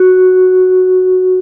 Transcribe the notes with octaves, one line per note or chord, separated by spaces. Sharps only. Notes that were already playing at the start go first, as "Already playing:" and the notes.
Already playing: F#4